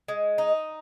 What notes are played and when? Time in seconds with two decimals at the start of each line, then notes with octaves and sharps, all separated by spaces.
0.08 G#3
0.38 D#4